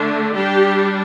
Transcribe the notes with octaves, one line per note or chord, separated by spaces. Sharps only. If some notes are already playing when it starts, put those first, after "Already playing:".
Already playing: D3 A3 D4
G3 D4 G4